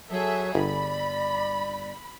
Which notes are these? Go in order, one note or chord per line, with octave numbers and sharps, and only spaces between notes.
F#3 G#4 A4 E5
G1 D5 B5